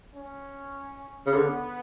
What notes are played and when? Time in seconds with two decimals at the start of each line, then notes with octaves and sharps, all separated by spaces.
0.15 C#4
1.27 C#3
1.34 D3 B3